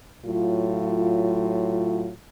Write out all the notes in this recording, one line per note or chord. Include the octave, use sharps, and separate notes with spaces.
A2 F#3 F4